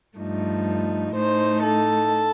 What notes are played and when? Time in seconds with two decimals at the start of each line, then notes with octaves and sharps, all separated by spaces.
0.18 G2 F3 A3 D#4
1.13 A2 A3 D#4 C5
1.61 A4